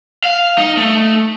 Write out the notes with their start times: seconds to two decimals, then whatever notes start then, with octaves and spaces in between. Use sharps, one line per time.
0.24 F5
0.58 D#4
0.77 A3